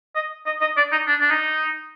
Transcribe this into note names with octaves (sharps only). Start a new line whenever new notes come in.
D#5
D#5
D#5
D5
D#4
D4
D4
D#4